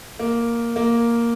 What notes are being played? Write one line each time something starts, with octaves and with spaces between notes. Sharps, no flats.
A#3
A#3